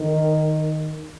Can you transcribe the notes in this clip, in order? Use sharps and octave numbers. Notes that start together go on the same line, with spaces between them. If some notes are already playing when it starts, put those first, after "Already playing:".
Already playing: D#3